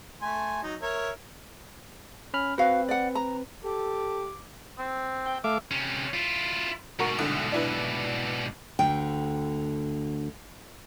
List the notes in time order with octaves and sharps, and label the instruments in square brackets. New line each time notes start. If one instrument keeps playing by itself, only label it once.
[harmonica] A3 G#5 C6
F#3 D#4
A#4 C#5 E5
[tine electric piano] C#4 B5 F6
[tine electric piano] C4 B4 [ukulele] F#4 F5
[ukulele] D5 F#5
A#5
[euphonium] G4 [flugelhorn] A4 [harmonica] D6
[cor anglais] C4
[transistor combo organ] G5
[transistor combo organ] A3 F5 D6 [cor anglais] E5
[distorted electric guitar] C3 C#4
E4 F4
[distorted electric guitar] G#2 B2 [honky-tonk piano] F#4 A#4 C#6
[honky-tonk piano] C2 D3
D4 E4 B4
[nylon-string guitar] D2 D3 G5